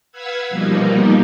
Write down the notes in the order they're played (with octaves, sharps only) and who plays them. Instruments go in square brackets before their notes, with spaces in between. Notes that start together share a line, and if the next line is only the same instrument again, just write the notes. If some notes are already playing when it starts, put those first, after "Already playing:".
[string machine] B4 F5 F#5 B5 E6 G#6
B2 F3 G3 A#3 D#4